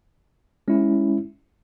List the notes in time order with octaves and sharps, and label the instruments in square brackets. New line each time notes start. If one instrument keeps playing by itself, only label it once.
[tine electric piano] G#3 C#4 E4